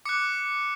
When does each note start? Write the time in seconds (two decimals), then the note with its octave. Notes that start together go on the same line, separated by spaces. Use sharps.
0.05 D6 F#6 C#7